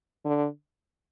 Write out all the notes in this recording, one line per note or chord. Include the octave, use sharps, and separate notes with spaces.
D3